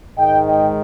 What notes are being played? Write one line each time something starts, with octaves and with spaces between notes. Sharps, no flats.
G#2 D#3 G#3 D#5 G5
D#5 G5